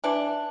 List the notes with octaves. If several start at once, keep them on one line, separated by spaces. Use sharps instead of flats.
E3 D4